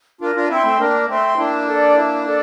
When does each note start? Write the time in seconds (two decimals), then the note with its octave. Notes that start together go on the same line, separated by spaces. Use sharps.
0.21 D4 F4 A#4
0.35 D4 F4
0.50 C4 E4 E5 G5 C6
0.64 A3 C4
0.79 A#3 D4 A#4
1.08 A3 C4 E5 G5 C6
1.38 A#3 D4 E4
1.67 A4 D5
1.96 E4
2.26 A4 D5